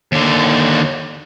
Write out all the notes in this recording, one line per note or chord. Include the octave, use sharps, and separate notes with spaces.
D#2 D3